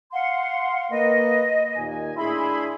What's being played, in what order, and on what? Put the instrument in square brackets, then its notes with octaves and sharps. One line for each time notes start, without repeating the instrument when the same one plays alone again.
[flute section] F5 F#5 C6
[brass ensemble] A#3 B4 [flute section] D#5
[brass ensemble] D#2 A#2 G#5
[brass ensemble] A2 D4 E4 [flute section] G#4 B5 C6